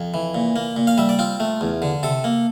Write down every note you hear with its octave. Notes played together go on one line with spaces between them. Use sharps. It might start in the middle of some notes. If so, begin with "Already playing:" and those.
Already playing: F2
E3
A#2
A#3
A#2
F5
G3 E5
D5
C4 F4
A3
E2
D3
C3 A4
A#3